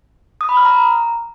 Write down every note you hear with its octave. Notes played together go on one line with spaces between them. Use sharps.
D#6
B5
F6
A#5